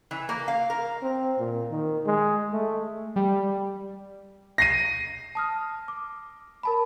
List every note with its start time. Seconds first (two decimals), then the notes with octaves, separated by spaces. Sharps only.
0.11 E3
0.29 A#3
0.48 F5
0.70 A#4
1.02 C4
1.39 A#2
1.71 D#3
2.06 G#3
2.53 A3
3.16 G3
4.58 A#6 C7 D#7
5.35 A5 D#6 F6
5.88 D6
6.63 A#4 A5 B5